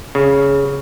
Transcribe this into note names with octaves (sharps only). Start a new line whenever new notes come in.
C#3